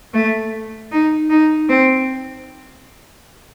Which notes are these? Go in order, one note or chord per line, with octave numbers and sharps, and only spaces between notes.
A3
D#4
D#4
C4